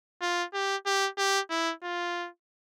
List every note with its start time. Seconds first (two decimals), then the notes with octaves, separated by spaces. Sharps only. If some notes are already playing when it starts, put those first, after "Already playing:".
0.22 F4
0.54 G4
0.86 G4
1.18 G4
1.50 E4
1.83 F4